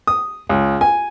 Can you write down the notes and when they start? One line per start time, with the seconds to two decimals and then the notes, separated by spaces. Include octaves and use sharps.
0.07 D#6
0.49 C#2
0.81 G#5